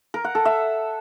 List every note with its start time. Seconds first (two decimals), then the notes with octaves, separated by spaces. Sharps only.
0.14 A#4
0.24 F#5
0.35 A4
0.45 E5